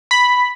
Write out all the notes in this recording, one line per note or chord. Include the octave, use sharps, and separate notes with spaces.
B5